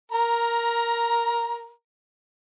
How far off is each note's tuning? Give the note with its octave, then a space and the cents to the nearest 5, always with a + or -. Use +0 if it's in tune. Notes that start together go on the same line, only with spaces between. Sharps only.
A#4 +0 A#5 +15